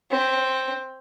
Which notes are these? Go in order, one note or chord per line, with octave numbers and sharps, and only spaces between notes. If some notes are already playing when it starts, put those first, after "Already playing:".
C4